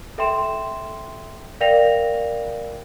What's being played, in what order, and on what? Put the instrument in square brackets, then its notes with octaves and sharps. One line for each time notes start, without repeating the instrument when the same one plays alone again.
[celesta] A4 E5 G5 C6 E7
A#4 D5 F5 G5 A#6 F7